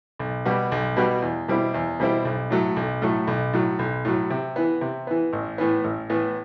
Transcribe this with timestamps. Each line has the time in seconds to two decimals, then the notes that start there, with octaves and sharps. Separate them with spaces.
0.19 B1
0.45 B2 G3 B3 F#4
0.72 B1
0.97 B2 G3 B3 F#4
1.22 E2
1.48 B2 G3 C4 E4
1.74 E2
2.00 B2 G3 C4 E4
2.25 B1
2.50 A2 F#3 A3
2.76 B1
3.02 A2 F#3 A3
3.27 B1
3.53 A2 F#3
3.79 B1
4.05 A2 F#3
4.30 C3
4.56 E3 B3
4.81 C3
5.07 E3 B3
5.33 A1
5.58 A2 E3 B3
5.84 A1
6.10 A2 E3 B3